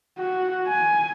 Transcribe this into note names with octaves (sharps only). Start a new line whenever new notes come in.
F#4
G#5